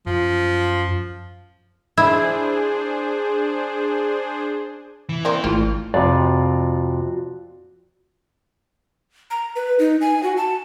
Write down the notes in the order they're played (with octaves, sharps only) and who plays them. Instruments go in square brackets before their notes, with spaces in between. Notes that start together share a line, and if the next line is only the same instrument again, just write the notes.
[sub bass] F#2 [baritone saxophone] F3
[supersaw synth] D4 G#4 C5 [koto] E4
[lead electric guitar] E3
[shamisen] A#3 C4 D5 [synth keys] C5
[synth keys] G#1 [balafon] A3 E4 [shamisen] F4
[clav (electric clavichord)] F2 C3 [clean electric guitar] F4 F#4 D5
[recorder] A#5
B4
D#4
G#5
F#4
A5